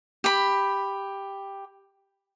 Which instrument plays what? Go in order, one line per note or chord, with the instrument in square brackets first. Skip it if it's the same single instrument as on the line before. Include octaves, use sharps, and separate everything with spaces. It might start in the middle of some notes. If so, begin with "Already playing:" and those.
[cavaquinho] G4 B5